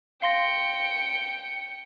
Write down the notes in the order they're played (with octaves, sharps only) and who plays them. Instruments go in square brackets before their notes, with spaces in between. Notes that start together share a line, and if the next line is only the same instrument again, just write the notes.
[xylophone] F5 C6 A#6 [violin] G5 C#7